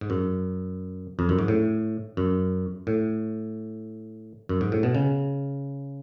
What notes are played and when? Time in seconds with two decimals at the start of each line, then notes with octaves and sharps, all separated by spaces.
0.01 G#2
0.10 F#2
1.19 F2
1.29 F#2
1.39 G#2
1.48 A2
2.17 F#2
2.87 A2
4.49 F#2
4.61 G#2
4.72 A2
4.83 B2
4.95 C#3